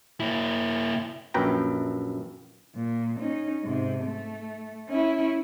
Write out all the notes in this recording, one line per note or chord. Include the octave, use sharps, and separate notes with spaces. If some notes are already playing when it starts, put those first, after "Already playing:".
A#3 E4
A#1 F#2 B4 G5 A#5
A#2
C#4 D#4
G#2 C3
A3
C#4 E4